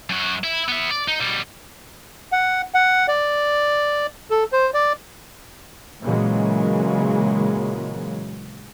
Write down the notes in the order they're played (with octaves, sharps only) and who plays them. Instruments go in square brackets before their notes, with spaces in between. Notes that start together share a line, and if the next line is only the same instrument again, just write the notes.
[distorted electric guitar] F#2 F#4
E4
B3 E5
D5
D#4
B2 G3
[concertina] F#5
F#5
D5
A4
C5
D5
[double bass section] A#2 C#3 E3 F#3 G#3 A#3